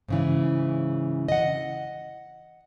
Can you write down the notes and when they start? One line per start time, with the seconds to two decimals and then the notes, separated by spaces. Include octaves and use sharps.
0.08 G#2 C#3 E3
1.28 D#5 F#5